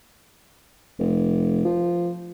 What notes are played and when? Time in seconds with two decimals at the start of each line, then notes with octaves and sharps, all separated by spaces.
0.99 F1
1.65 F3